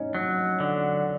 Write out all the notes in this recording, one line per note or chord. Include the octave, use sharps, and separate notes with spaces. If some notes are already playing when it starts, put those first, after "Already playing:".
Already playing: C#4 D#4
F#3
D3